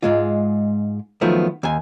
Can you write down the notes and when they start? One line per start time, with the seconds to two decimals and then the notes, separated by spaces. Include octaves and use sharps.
0.03 G#2 G#3 F4
1.21 D#3 F3 F#3 A3 B3
1.63 D#2 G#5